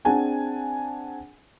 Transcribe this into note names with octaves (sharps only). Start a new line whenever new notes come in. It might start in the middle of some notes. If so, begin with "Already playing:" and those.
C4 D4 G#4 F#5 G#5 A5